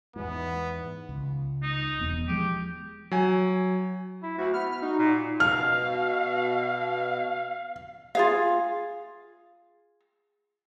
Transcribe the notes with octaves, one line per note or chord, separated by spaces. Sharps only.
E2 G#2 B3
C#2
D#4
E1 E2 B3
F3 G#3 G4
F#3 G#5
E4
D2 F#4
B3 F6
F6
D#4 F#4
A#2
B2 F5 F6
F4 G#4 F5